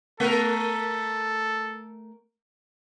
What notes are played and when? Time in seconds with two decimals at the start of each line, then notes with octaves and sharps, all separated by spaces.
0.20 A3 A4 A#4